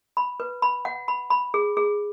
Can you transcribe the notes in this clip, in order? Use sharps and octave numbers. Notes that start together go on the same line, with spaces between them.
B5
B4
B5
F#5
B5
B5
G#4
G#4